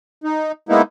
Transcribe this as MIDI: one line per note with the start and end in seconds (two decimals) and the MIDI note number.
0.24 0.52 63
0.69 0.82 56
0.69 0.82 58
0.69 0.82 59
0.69 0.82 63
0.69 0.82 64